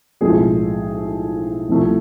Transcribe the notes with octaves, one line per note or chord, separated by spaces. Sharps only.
B1 A2 F3 G#3 C4 G#4
C2 C3 F3 A3